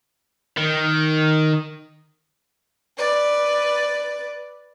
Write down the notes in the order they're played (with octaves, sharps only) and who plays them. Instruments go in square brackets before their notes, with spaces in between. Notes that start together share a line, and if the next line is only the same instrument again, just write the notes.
[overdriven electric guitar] D#3
[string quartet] B4 D5